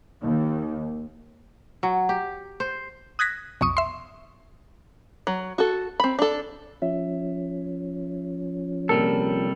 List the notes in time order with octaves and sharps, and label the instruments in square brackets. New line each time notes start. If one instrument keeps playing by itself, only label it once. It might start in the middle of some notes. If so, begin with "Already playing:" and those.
[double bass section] D#2
[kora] F#3
G4
C5
[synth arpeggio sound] D#6 F#6 G#6 A#6 B6
B1 F2 C#6 D#6
E5 C6
[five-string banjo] F#3
F#4 A4
C4 B5
D4 A4
[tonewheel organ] F3 C#4 [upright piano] E5
[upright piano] A#1 A#4 [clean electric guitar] C3 G3 A4